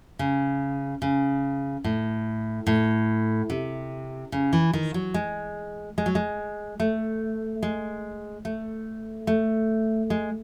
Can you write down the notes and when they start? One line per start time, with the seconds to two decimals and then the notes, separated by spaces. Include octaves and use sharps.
0.19 C#3
1.02 C#3
1.84 A2
2.67 A2
3.50 C3
4.32 C#3
4.53 E3
4.73 D#3
4.94 F#3
5.14 G#3
5.98 G#3
6.06 F#3
6.15 G#3
6.80 A3
7.63 G#3
8.45 A3
9.27 A3
10.10 G#3